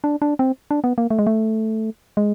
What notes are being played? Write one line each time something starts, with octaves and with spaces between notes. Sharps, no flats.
D4
D4
C4
D4
B3
A#3
A3
G#3
A3
G#3